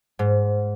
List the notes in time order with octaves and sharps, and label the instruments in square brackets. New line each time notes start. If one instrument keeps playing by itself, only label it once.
[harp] G#2